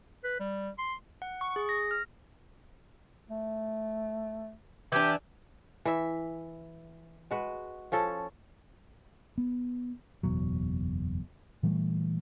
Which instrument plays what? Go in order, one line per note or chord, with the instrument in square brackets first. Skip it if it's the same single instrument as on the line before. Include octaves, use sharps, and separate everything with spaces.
[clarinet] B4
G3
C6
[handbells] F#5
C#6
G#4
A#6
F6
[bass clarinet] A3
[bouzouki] E3 D4 [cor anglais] G4
[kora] E3 E5
G#3 F#4 B4
F3 C#4 A4
[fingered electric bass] B3
F#1 E2 B2 F#3
A#2 E3 G3 A3